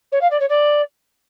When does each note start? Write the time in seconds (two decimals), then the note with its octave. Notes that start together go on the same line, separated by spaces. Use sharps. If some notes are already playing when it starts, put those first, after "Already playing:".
0.12 C#5
0.21 F5
0.30 D5
0.40 C#5
0.49 D5